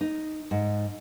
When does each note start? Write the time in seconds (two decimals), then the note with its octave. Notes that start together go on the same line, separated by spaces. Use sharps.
0.01 D#4
0.51 G#2